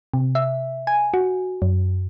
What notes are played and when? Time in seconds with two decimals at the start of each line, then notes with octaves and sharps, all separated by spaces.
0.14 C3
0.35 E5
0.87 G#5
1.14 F#4
1.62 F#2